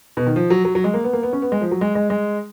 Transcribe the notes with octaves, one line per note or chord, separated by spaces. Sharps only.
B2
D#3
F3
F#3
F#3
F#3
G#3
A#3
B3
A#3
B3
C#4
B3
G#3
F3
F#3
G#3
G#3
G#3